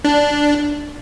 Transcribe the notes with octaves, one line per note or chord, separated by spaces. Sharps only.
D4